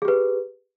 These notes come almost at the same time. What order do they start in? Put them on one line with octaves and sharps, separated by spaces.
G#4 G4 B4